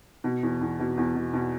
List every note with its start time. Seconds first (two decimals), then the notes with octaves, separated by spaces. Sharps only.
0.24 B2
0.43 E2
0.61 E2
0.79 B2
0.97 E2
1.15 B2
1.33 B2